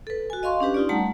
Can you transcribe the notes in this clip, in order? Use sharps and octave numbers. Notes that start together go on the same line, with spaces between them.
A4 B4
F#4 G#5
D#5 F5 C6 C#6
C#4 D4 G4 B4
D#4 F4 D5
G3 A3 F#5 A5 A#5